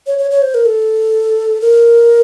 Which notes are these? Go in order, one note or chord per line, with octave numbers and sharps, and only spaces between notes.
C#5
C#5
C#5
C5
A#4
A4
A#4